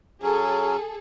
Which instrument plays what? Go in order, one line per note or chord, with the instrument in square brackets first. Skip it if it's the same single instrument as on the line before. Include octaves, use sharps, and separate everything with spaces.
[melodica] F#3 C#4 [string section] G#4 A4